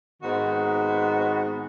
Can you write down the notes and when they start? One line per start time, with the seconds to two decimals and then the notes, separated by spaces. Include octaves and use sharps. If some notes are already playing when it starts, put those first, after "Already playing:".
0.23 G#2 D#3 B3 C4 F#4